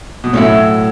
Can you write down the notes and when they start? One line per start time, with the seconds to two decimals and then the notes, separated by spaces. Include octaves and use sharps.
0.24 B2
0.33 A2 F#3 C#4 E4